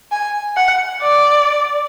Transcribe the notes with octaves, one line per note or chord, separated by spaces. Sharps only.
G#5
F#5
D5